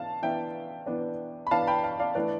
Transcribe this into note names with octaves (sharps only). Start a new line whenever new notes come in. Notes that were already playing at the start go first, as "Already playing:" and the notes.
Already playing: E3 D4 F5 A5
E3 B3 D4 E5 G5
E3 B3 D4
B5
E3 B3 D4 F5 A5
G5 B5
F5 A5
D5 F5
E3 A3 D4 B4 D5